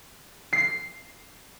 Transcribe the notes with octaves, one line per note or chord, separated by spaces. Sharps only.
C7